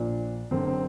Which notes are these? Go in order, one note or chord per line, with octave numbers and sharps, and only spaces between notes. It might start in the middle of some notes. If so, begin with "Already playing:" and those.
Already playing: A#1 A#2 D4
F#1 F#2 D3 C4
C4